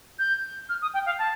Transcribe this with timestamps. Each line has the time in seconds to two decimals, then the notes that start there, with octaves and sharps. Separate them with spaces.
0.19 G6
0.69 F6
0.82 D#6
0.93 G5
1.06 F5
1.19 A5